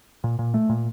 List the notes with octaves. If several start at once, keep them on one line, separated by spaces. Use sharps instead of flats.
A#2
A#2
A3
A#2